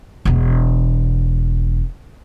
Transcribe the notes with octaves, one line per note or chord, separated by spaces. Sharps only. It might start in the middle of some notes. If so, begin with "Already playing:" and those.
E1 B3